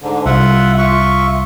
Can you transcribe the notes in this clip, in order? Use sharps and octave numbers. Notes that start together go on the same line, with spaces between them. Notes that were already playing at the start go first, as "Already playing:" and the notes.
G#2 D3
C2 F4 E5 F#5
F4 E5 C#6